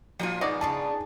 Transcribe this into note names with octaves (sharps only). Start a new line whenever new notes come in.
A#2 F3 A#3 F4 G#5
G#2 B2 B3 D5 D#5
C#3 D4 B4 A5